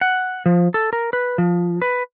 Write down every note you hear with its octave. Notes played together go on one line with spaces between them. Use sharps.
F#5
F3
A4
A#4
B4
F3
B4